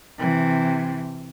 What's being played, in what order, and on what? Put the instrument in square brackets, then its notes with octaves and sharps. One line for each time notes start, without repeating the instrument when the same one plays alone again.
[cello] C3 E3